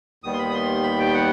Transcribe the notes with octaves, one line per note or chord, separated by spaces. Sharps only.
D#2 D#3 G3 B3 D#6
C6
B5
D#6
C6
B5
G5
F#5